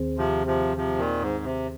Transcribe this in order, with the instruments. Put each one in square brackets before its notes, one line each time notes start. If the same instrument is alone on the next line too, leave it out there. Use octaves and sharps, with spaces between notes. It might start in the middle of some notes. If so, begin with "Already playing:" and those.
Already playing: [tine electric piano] D#2 D#3 C4 G#4 C5
[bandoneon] C3 F3
C3 F3
C3 F3
A#2 D#3
G#2
C3